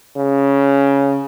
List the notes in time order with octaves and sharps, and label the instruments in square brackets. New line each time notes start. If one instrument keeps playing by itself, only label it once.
[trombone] C#3